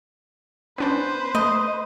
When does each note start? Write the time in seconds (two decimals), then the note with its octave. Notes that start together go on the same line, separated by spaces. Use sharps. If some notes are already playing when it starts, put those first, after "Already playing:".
0.78 B3 C#4 D4 B4 C5
1.35 A3 D#5